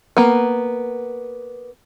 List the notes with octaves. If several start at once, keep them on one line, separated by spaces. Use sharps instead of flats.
A#3 B3